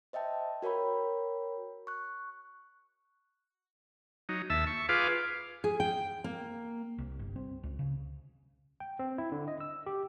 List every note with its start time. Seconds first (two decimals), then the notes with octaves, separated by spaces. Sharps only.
0.13 C5 D#5 E5 G5 A5
0.62 F#4 A#4 C#5 G5 B5
1.87 C#6 F#6
4.29 F#3 D#4
4.50 D#2 E5 A5 E6
4.67 C#6
4.89 F4 G#4 B4 F5 D6
5.64 G#4
5.80 G5
6.24 A#3
6.98 C2
7.19 G1
7.36 C4
7.63 C#2
7.79 C#3
8.80 G5
8.99 C4
9.18 E4
9.32 D3
9.48 D#5
9.60 E6
9.86 G4